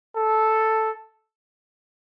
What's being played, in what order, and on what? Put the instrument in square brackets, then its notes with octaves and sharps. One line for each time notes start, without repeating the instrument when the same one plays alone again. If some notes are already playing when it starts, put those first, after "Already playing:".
[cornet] A4